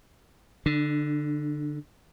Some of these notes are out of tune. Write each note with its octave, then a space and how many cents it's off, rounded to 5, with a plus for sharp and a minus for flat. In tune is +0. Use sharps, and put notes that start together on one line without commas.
D3 +0 D4 +35